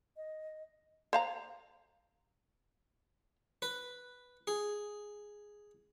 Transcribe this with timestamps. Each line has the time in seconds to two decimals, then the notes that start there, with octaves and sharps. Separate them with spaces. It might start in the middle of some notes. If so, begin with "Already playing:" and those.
0.17 D#5
1.13 C5 F5 A#5
3.62 B4
4.47 G#4